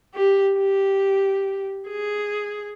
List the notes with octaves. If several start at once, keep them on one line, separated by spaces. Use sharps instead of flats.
G4
G4
G#4